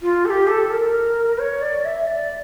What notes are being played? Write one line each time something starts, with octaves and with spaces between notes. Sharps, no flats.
F4
A4
G4
A4
A#4
C#5
D5
E5
D5